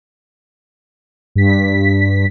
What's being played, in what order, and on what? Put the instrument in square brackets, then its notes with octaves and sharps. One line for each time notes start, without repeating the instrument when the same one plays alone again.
[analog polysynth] G2 B6